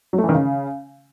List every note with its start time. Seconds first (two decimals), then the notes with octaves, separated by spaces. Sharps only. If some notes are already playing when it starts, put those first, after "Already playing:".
0.13 F#3
0.18 A3
0.24 E3
0.29 D#3
0.34 C#3